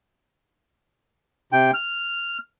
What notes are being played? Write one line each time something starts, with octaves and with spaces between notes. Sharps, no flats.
C3 G5
F6